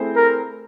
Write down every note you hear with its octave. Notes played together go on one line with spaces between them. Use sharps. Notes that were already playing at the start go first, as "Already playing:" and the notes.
Already playing: A3 C4 E4 G#4 C5
A#4